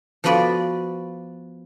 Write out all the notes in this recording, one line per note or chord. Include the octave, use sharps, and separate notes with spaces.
F3 B3 F#4 B4 D5